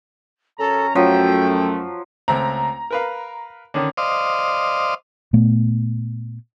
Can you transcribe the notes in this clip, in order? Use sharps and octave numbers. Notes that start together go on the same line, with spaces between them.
F#2 C#4 A4 A#5
F#2 F3 F#3 A3 G5
C#2 A3 C4 A#5
A#4 B4 F5
D3 D#3 C#4
C5 D5 D#5 F5
A#2 A3 B3